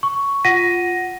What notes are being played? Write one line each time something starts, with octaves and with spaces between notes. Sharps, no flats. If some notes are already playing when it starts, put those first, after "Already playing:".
C#6
F4 F#5 A#6 B6 D#7